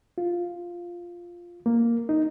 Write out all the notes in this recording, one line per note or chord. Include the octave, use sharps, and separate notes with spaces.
F4
A#3
D#4